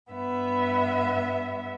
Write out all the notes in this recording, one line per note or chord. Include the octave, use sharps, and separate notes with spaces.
G2 B3 E5